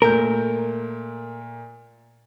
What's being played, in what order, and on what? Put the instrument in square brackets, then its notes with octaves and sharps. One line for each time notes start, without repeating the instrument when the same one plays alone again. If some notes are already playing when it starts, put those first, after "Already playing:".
[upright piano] A#2 A3 G6 [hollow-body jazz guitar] A#4